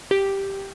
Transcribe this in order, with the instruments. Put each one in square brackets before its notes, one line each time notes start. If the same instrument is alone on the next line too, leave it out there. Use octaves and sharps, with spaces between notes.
[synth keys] G4